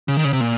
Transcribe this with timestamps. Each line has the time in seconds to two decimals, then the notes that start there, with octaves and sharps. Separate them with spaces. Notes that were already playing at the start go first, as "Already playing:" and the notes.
0.08 C#3
0.17 D#3
0.25 C#3
0.33 C3
0.40 A#2